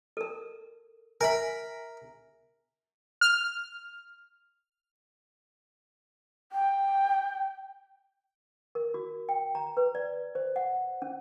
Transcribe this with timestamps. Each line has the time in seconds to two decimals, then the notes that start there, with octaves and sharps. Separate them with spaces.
0.17 A4 A#4
1.21 A#4 E5 G#5 B5
3.21 F6
6.52 G5
8.75 A#4
8.94 F#4
9.29 G5
9.55 A#5
9.77 B4
9.95 D5
10.35 C5
10.56 F#5
11.02 C#4